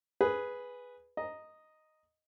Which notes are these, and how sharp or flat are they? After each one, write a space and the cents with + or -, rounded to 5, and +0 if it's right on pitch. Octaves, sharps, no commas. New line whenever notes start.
G#4 +0 B4 +0
D#5 +0 A#5 +0